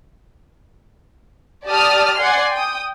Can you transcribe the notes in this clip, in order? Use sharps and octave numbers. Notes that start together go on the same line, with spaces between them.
G4 D5 A5 D#6 F6
D5 F#5 G#5 C6
G5 D#6